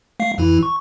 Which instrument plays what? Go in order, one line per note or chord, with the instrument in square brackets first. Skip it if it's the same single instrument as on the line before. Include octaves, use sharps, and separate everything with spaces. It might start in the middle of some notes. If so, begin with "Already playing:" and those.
[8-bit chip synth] A3 F5 C7
F2 E3 E4
C#6